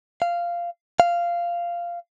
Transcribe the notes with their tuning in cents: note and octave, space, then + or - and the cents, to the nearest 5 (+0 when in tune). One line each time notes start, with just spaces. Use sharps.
F5 -10
F5 -10